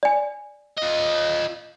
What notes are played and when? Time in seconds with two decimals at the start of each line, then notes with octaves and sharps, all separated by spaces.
0.03 D5 G#5
0.78 F4 D#5